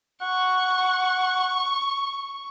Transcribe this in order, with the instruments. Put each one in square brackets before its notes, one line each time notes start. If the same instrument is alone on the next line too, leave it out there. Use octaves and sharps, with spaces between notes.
[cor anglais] F#5 [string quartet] C#6